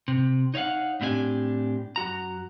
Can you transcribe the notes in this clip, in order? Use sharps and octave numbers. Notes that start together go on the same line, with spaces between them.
C3
D#4 C#5 D#5 F5 F#5
A2 C4 D4 G4 D5 G#5
F#2 F#4 A#5